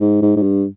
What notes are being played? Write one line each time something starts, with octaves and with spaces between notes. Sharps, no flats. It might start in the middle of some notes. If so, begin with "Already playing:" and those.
G#2
G#2
G#2
G2